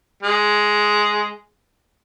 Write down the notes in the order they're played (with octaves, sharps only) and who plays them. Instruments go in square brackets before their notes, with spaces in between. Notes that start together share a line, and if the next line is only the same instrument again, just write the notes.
[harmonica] G#3